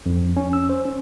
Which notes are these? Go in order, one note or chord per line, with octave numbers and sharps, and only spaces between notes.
F2
C#4
E6
C5
C#4